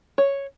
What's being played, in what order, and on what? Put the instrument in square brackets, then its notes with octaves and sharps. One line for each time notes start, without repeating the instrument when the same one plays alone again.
[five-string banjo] C#5